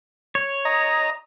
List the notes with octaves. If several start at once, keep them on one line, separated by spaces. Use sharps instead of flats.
C#5
D#5 A#5